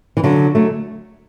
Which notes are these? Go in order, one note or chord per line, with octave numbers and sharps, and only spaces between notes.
E3
D3 F#3
F#3 A3